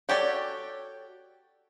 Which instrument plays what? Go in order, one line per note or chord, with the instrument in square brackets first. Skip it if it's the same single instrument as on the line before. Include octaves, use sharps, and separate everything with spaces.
[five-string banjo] F#4 G4 A4 C#5 D5